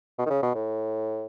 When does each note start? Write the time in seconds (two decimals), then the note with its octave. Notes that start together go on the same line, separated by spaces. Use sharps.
0.19 B2
0.26 D#3
0.30 C#3
0.43 B2
0.55 A2